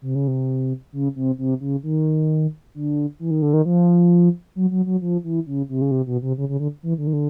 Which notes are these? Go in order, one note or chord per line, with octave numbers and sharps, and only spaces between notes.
C3
C#3
C3
C#3
C3
C3
C#3
D#3
D3
E3
D#3
D3
D#3
F3
F#3
F#3
F#3
F3
E3
C#3
C3
C#3
C3
B2
C3
C#3
C#3
D3
E3
D3
D#3
D3